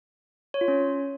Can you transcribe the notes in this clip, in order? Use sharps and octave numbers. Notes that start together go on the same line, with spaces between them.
C#5
F4
C#4